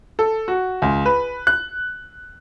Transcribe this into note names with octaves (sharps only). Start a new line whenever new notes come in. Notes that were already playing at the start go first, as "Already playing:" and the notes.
A4
F#4
C#2
B4
F#6